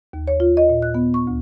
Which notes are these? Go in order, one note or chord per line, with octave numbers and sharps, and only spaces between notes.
D#2
C#5
F4
D#5
A#2
F#6
B3
C#6
D2